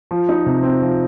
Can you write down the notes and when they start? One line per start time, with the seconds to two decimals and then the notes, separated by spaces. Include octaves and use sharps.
0.11 F3
0.29 D#4
0.46 C3
0.63 C4
0.82 F3